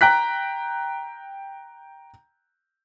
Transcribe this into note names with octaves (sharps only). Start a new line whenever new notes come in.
G5 A#5 F#6 B6